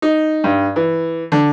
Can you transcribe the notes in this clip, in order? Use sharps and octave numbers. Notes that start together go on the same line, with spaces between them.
D#4
G2
E3
D3